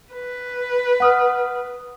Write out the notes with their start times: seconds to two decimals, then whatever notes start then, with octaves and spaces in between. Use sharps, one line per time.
0.12 B4
1.00 F#5 D#6 F6